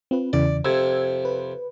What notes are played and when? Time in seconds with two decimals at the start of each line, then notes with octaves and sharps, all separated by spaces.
0.11 C4 F4 B4
0.33 E2 C#3 E3 D5
0.65 F2 C3 E6 G#6
1.25 B4